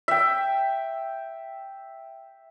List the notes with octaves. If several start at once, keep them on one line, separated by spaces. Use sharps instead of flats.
E5 G5